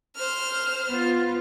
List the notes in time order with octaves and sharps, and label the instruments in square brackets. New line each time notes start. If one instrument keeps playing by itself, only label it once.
[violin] C5 F6
[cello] B3 F4